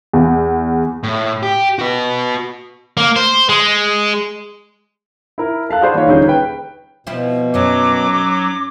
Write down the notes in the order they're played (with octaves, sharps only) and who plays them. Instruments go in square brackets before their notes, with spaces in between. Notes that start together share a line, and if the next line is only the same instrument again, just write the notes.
[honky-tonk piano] E2
[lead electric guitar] A2
G4
F#4 B4
[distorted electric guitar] A#3
C5
G#3
[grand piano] E4 A#4
A4 F5 A5 F#6
F#4 G#4 C5 D5 B5
E3 A#3 D#4 F4 C#5
D#1 D3 C#4 D#4 G#4 G6
B4 G5
[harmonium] B2 [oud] F3 C4 E4
[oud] F#2 C#4 D#4 [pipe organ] F#3 [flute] D6